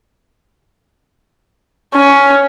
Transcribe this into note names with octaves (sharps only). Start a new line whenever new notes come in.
C#4